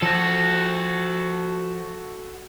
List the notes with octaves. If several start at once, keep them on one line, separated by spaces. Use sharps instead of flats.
F3 F#4 A4